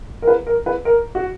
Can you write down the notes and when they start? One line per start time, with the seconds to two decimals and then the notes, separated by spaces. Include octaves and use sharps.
0.22 A#4
0.27 B4
0.47 A#4
0.66 B4
0.85 A#4
1.15 F#4